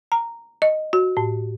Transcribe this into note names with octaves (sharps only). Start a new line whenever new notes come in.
A#5
D#5
F#4
A2